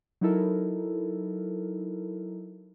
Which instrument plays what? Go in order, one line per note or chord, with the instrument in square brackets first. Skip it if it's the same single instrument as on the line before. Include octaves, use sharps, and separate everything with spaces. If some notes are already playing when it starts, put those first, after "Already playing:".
[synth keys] F#3 D#4 E4 A4 A#4